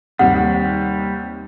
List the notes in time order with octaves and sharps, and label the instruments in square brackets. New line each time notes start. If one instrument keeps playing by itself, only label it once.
[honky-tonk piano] D#2 C3 [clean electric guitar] G3 [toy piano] F#5